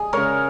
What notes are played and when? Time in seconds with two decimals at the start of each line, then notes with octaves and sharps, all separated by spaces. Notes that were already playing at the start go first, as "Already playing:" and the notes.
Already playing: G#4 D#5
0.13 C#3 G#3 A#4 C#5